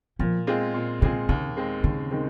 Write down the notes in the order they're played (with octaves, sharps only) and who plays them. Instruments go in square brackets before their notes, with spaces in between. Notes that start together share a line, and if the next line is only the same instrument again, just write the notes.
[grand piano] A#2 [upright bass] F3
[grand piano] G#3 C4 F4 G#4
A#2
[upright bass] C#3 [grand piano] G#3 C4 F4 G#4
[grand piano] D#2 [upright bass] C#3
[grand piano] D#3 G#3 C4
[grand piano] D#2 [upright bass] C#3
[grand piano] D#3 G#3 C4